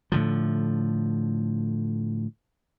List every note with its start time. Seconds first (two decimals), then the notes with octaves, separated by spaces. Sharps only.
0.12 A2 D3 F3